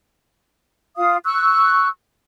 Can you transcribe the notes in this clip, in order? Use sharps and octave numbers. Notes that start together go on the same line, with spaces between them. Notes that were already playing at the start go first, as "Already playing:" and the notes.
F4 F5 D#6
C#6 E6 F#6